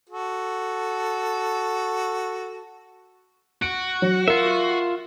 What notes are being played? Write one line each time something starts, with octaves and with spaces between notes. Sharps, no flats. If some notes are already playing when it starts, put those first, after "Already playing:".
F#4 A4
F#4 D7
F#3
F4 A#4 E5